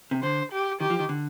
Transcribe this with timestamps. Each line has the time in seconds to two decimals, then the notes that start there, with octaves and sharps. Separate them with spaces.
0.11 C3
0.23 D3 C5
0.52 G4
0.80 D#3 G4
0.90 F3
0.99 D#3
1.09 D3